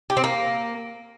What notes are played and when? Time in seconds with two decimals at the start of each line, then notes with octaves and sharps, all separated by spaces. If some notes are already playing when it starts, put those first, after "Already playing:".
0.10 G4
0.17 C4
0.24 A#3